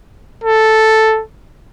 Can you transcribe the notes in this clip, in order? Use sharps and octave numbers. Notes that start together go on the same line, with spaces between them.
A4